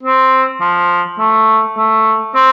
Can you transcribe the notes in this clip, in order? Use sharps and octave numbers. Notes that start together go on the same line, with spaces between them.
C4
F3
A3
A3
C4